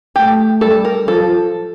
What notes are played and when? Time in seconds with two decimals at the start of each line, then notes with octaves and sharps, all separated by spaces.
0.16 A3 G4
0.61 G3 A4
0.85 A#4
1.07 F3 A4